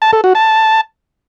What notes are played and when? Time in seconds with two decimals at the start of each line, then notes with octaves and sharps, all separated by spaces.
0.02 A5
0.13 A4
0.24 F#4
0.35 A5